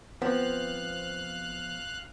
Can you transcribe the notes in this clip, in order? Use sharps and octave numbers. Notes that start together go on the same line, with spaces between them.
F3 B3 C4 F5 F#6